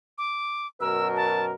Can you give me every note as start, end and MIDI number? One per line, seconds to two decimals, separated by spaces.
0.18 0.67 86
0.80 1.52 42
0.80 1.52 47
0.80 1.52 70
0.80 1.08 88
1.16 1.45 81